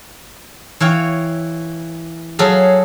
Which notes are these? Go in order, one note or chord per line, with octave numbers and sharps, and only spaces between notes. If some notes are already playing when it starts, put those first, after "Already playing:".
E3 C#5 F5 G5
F#3 G#4 A4 F5